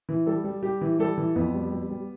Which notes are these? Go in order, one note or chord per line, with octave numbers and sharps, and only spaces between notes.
E3
G3 A4
G3
G3 G4
E3
G3 A4
E3
F2 B3
G3
G3
G3